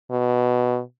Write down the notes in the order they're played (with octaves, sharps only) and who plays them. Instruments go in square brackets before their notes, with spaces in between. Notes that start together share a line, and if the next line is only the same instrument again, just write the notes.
[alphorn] B2